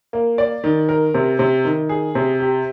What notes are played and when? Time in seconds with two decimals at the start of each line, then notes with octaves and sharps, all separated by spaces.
0.13 A#3
0.38 D5
0.64 D#3
0.89 A#4
1.14 C3
1.39 C3
1.65 D#3
1.89 G#4
2.15 C3
2.40 G4